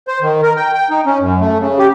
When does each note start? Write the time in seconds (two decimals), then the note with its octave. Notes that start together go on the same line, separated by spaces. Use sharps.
0.08 C5
0.22 D#3
0.43 A#4
0.57 G5
0.74 G5
0.90 D#4
1.06 C#4
1.20 F#2
1.40 A3
1.60 C#3
1.79 G4